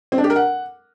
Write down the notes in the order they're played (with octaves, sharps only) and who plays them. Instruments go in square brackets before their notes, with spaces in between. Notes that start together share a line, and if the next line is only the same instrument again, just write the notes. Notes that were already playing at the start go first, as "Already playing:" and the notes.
[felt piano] C4
D4
G4
A#4
F#5